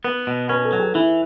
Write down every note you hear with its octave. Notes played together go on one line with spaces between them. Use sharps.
B3 B4
B2
C#4 B4
A4
F#3
G#4
E3 E4